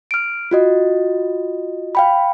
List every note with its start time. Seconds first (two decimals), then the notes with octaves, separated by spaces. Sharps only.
0.11 F6 D7
0.51 F4 F#4 D#5
1.95 F5 G5 B5